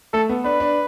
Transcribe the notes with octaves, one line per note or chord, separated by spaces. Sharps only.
A3 A4
B3
D4 B4
D4